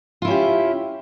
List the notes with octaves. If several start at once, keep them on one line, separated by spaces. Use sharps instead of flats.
C#4 E4 F4 G4